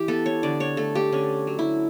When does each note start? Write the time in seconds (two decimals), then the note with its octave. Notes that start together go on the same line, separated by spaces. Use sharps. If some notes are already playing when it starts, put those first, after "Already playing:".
Already playing: E3 G4
0.08 B3 A4
0.26 C#5
0.43 D3 D5
0.60 C#5
0.77 A3 A4
0.95 G4
1.12 D3 C#4
1.47 F#3
1.59 E4